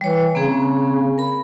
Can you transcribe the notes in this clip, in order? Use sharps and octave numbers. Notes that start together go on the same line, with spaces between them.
E3 G3 C#5
C#3 A#3 C4 G#4
A#4 B5